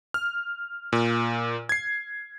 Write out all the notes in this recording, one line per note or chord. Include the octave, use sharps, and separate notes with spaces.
F6
A#2
G#6 C7